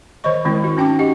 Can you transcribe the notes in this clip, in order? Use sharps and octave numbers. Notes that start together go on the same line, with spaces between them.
D#3 C5 C#5 D#5 C#6
D#3 G#3 C4 E4
F#4
C#4 D#4 G5 A5 D6
F#4 G4 D#5 F#5